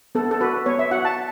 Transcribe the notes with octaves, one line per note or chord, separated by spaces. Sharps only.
B3 A4
A4
F#4 B4
B3 C#5
E5
F#4 F#5
A5